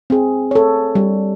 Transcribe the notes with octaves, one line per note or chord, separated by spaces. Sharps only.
C4 G#4
A4 C#5
G3